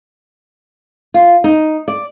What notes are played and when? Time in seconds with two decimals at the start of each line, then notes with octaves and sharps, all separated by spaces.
1.14 F4
1.44 D#4
1.88 D5